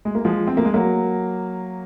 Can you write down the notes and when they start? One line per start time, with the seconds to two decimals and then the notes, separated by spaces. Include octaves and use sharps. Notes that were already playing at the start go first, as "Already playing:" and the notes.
0.05 G#3
0.15 A#3
0.25 F3 G#3
0.47 C4
0.57 A#3
0.65 G#3
0.74 F#3 A#3